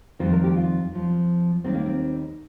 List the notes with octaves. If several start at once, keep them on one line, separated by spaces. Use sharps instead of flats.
F2 D#3 G3 C5
A#4
G4
F4
F2 F3
D#2 D#3 G3 C4
A#3
C4